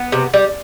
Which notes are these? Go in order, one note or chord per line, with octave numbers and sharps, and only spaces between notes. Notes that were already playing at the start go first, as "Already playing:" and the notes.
Already playing: B3
C3
G3